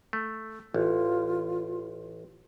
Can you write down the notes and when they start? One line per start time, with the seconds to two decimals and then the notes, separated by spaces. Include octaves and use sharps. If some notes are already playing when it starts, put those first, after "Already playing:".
0.13 A3
0.74 A1 F4